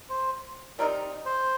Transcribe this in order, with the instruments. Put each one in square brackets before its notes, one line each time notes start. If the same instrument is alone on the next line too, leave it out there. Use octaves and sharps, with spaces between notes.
[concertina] C5
[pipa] G3 C4 D#4 [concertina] A#4
[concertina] C5